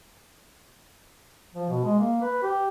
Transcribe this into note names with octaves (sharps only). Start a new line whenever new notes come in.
F3
B2
G#3
A#3
B4
G4